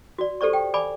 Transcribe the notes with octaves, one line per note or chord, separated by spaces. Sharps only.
F#4 D5
G4 A4 C5 D5 C#6
G5
D5 G#5 B5 D6